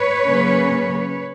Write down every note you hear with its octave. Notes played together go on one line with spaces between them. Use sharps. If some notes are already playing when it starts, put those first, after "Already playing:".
Already playing: B4 C#5
C#3 F#3 A#3 C#4